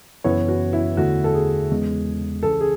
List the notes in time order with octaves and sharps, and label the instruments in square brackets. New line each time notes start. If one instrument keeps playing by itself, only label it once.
[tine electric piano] F#2 C#3 E3 B3 E4 [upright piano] C#5
[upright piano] F#4
E4
[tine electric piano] E2 D3 A3 [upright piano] F#4
[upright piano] A4
G#4
[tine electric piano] E2 C#3 G#3
[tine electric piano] C#2 C#3 E3 [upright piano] A4
[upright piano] G#4